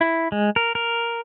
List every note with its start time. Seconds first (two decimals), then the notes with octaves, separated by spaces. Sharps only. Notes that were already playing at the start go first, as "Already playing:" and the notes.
0.01 E4
0.32 G#3
0.56 A#4
0.75 A#4